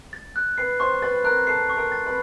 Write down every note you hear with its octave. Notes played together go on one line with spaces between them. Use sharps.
A6
F#6
B4 B5 C7
C5 C6 C#6
B4 B5 A6
A#4 A#5 F#6
A4 A5 C7
C#6
A#4 A#5
A6
B4 B5